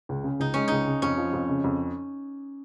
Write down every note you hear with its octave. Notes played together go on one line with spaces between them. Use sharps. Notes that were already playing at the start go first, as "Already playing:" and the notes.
C#2
C#3
C#2 D#4
G#3 C#4
C#2 D#4
C#3
F2 C#4
F3
F2
C#3
F2